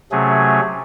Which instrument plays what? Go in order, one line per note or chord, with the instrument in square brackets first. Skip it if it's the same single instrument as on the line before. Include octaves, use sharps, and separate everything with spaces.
[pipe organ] C3 F#3 A3 C#4 G#4